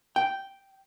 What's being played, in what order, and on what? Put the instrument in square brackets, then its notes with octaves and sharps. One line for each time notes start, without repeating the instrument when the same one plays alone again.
[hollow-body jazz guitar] G5